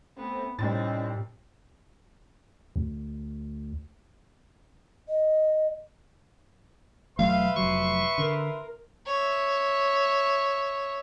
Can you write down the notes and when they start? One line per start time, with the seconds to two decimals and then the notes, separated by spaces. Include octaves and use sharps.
0.17 A3 B3 C4
0.59 C2 A2 C4 C#4 D#4 A6
2.76 D2
5.09 D#5
7.19 E1 F#3 A3 B4 E5 F5 C6
7.56 F1 F#3 C#6
8.18 D3 A#4
9.06 C#5 E5